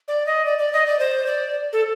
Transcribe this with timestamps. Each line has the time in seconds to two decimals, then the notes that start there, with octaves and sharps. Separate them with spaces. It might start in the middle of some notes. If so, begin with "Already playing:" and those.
0.08 D5
0.26 D#5
0.45 D5
0.59 D5
0.73 D#5
0.87 D5
0.99 C5
1.26 D5
1.73 A4